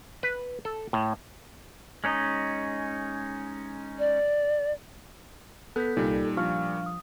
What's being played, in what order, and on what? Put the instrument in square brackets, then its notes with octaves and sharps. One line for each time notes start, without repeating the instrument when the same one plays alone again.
[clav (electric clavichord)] B4
A4
A2
[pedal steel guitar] G#3 C#4 D#4
[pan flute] D5
[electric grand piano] B3 [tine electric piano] A4 [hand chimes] F#6 G6 B6
[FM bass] C2 [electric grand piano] A#2 G3 [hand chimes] D#4
[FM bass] F3 [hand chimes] D4 F5 F6 [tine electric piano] C#6
[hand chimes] D#6